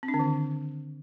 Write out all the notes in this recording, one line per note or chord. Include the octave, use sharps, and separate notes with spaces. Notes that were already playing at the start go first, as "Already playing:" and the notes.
C4
D4
D3
D#3